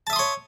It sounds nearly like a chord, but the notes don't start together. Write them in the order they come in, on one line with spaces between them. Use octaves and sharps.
A5 E5 D#6 C6 C#5